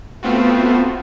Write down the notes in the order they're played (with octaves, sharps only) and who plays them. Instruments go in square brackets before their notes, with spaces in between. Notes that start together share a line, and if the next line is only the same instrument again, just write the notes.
[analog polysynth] A3 B3 C4 F4 F#4